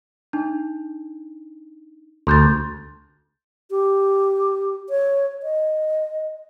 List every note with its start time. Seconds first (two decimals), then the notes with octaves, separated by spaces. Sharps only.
0.33 D4 D#4
2.27 D2 C6 G6 A6
3.71 G4
4.90 C#5
5.43 D#5